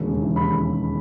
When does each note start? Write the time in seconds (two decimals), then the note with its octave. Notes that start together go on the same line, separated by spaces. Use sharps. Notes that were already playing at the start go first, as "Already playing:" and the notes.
Already playing: E1 D#2
0.08 C#3
0.22 E3
0.36 D#2 B5